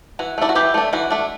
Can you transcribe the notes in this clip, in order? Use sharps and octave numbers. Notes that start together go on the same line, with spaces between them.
E3 F#4
A3 D4 E4
F#4
E3 E4 G4
A3 D4
E3 F#4
A3 D4